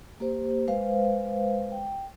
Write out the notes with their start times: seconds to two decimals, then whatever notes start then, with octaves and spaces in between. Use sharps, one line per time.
0.20 A#3 G4 C5
0.68 G#3 B4 C5 F5
1.72 G5